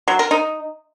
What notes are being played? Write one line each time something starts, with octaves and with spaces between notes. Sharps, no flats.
F#3
A#4
D#4